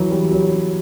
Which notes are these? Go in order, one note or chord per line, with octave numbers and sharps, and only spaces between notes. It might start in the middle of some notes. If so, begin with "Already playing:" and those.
Already playing: E3 F#3
G3
F#3